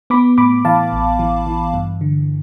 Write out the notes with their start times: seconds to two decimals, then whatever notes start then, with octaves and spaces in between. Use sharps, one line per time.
0.10 B3 B5 D6
0.38 A2 B5 D6
0.65 E3 F5 A5
0.92 A1
1.19 E3
1.47 E3
1.74 G2
2.01 D3